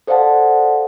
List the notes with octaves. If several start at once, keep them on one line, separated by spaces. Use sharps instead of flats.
A4 C5 D5 F5 F#5 A5